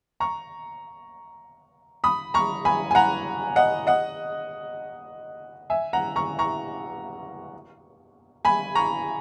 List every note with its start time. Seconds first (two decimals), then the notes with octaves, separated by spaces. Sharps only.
0.20 A#5 C#6
2.04 B5 D#6
2.34 A#5 C#6
2.65 G#5 B5
2.91 G#5
2.95 F#5 A#5
3.56 D#5 F#5
3.87 D#5 F#5
5.70 E5 G#5
5.93 F#5 A#5
6.16 A#5 C#6
6.39 A#5 C#6
8.45 G#5 B5
8.75 A#5 C#6